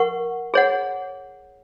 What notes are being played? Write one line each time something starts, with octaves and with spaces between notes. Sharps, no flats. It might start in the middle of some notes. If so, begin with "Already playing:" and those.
Already playing: A#4 F#5 C#6
G#4 C#5 F#5